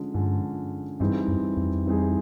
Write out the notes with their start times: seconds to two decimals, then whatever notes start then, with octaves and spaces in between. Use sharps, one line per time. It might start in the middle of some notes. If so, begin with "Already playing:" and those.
Already playing: D3 F3 G#3 C#4
0.14 G2 D3 F3 G#3 C#4
1.00 G2 E3 G3 C4 D#4 G#4
1.28 F#2
1.57 F2
1.86 E3 G3 C4 D#4 G#4